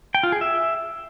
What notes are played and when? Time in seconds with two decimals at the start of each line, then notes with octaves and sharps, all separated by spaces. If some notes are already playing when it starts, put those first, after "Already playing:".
0.15 G5
0.23 F4
0.32 G#4
0.41 E5